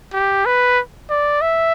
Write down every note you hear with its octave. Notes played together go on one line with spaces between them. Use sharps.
G4
B4
D5
E5